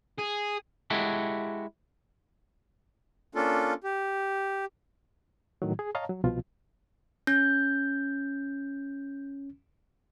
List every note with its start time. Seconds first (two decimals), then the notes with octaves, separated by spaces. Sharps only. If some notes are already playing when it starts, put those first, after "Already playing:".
0.19 G#4
0.90 G#3 E4 F#4 G4 A4
3.35 A#3 C#4 D4 F4 A4
3.84 G4
5.62 A2 D#3 F#3
5.79 G#4
5.95 C#5 D#5 F5 A5 A#5
6.09 F#3
6.24 C2 B2 F3 F4
7.27 C#4 G6